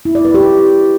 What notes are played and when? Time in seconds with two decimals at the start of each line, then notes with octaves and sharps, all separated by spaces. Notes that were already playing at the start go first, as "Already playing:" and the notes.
0.05 E4
0.15 D5
0.25 B4
0.34 G4